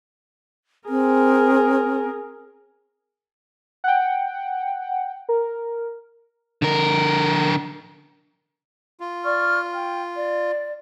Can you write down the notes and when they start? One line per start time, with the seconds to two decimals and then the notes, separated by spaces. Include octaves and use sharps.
0.89 C4 G#4 A#4
3.84 F#5 G5
5.29 A#4
6.62 D3 A#4
9.00 F4
9.23 D5 C#6 F6
9.73 G5
10.15 D5